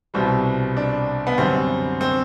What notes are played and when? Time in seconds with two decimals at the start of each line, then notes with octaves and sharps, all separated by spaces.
0.14 C2 B2 G3 C4
0.77 D4
1.27 B3
1.38 F#2 D3 G3 C4
2.01 C4